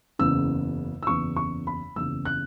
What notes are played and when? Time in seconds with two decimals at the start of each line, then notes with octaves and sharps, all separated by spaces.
0.19 F#1 E2 C#3 E6
1.03 E6
1.07 F#1 E2 C#3 C#6
1.36 C#6
1.67 B5
1.96 F#1 E2 C#3 E6
2.25 F#6